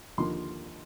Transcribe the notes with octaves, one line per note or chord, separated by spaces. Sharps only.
D#2 D3 F3 A#3 C6